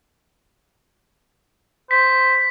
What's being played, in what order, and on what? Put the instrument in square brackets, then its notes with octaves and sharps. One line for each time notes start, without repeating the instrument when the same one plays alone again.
[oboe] C5 [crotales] B6